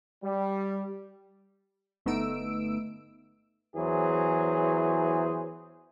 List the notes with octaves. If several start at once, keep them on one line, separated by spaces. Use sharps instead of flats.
G3
G1 A3 B3 D#4 E6 D7
E2 E3 F#3 G#4 C5